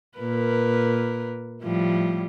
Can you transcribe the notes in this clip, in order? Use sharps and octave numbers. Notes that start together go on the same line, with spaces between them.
A#2 A#4 B4
A2 F3 G3